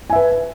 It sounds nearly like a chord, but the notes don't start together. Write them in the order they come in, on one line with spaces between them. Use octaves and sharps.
G#5 E5 B4